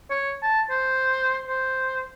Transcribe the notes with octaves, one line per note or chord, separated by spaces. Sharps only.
C#5
A5
C5
C5